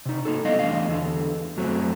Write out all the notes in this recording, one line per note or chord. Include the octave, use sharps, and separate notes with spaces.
C3 D#4
A#3 D#4 A4
G3 B3 E4 D#5 F5
E2 G3 A3 D4 F5
E2 D3 A4
F#2 F#3 A3 C4